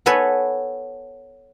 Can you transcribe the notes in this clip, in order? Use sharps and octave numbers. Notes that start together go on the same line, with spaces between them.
B3 A4 B4 C#5 G#5